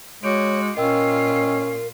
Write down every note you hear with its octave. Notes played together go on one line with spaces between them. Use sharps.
G#3 F#4 C#5 D6 G6 D7
A#2 C#4 F4 A#4 D#5 G5 E6